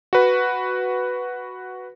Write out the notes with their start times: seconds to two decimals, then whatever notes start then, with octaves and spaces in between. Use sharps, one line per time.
0.13 F#4 B4